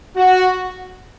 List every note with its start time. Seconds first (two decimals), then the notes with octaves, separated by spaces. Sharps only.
0.16 F#4